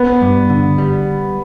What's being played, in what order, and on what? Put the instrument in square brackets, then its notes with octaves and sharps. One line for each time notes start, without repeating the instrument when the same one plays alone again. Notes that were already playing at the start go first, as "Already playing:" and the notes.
Already playing: [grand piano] B3
[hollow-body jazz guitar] G2
D3
G3